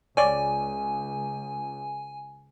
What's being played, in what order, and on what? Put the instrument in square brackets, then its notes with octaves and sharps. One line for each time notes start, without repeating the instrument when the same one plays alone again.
[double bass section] C#2 [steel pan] C#5 D5 [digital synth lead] G#5